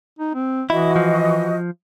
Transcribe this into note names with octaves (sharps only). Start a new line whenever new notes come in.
D#4
C4
E3 E4 F#4 D#5
F3